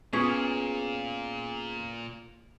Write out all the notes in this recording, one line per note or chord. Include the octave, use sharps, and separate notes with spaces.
A#2 B3 C#4 F4 G#4